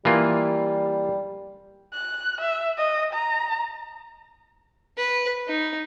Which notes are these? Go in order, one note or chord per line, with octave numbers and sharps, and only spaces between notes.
E3 G3 A#3 F4
F#6
E5
D#5
A#5
B4
D#4